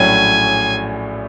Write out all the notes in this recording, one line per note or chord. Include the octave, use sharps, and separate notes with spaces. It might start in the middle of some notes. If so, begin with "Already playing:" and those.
Already playing: A#1 A2 F#3 A3 C#4 G#5